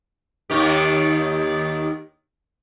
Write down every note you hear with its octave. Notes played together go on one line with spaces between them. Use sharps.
D#2 D#3 G4